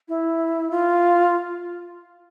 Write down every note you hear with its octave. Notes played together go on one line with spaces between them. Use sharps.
E4
F4